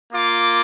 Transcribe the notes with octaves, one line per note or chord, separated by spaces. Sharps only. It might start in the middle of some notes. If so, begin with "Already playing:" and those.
A#3 F4 D6